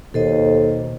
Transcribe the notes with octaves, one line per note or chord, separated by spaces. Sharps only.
D#2 B2 A4 C5 D#5